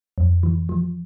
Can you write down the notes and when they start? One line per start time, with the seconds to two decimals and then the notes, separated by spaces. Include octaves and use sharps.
0.18 F2
0.43 E3
0.69 F3